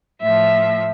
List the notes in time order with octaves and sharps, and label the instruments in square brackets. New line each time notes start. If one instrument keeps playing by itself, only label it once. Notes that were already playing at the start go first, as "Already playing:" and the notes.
[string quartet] A2 F3 E5